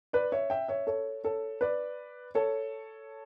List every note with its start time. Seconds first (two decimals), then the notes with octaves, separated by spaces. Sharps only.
0.13 B4 D5
0.32 C#5 E5
0.50 E5 G5
0.68 C#5 E5
0.87 A4 C#5
1.24 A4 C#5
1.61 B4 D5
2.35 A4 C#5